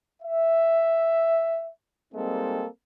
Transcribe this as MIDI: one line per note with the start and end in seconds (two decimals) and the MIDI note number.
0.23 1.69 76
2.14 2.66 55
2.14 2.66 56
2.14 2.66 58
2.14 2.66 60
2.14 2.66 63
2.14 2.66 69